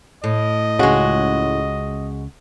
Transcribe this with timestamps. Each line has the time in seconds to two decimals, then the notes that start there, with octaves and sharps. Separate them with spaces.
0.24 A2 D#5
0.79 C#2 C#3 G#3 F#4